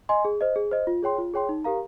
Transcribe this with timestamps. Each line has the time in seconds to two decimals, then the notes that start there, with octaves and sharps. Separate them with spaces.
0.09 D#5 G#5 C6
0.25 G#4
0.41 C5 D#5
0.56 G#4
0.71 C5 D#5
0.87 F4
1.03 G#4 C#5 G5 C6
1.18 F4
1.34 G#4 C#5 G5 C6
1.49 D#4
1.64 G4 A#4 F5 A#5